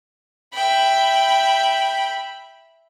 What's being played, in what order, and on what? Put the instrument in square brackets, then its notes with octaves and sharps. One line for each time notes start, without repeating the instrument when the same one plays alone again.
[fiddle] E5 B5 [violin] G5